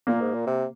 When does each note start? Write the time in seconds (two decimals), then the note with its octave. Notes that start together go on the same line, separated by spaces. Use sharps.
0.07 A#2 A#3
0.21 G#2
0.34 A#2
0.47 C3